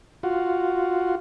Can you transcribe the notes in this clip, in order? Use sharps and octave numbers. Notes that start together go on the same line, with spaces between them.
F4 F#4